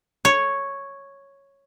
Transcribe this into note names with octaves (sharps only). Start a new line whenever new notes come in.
C#5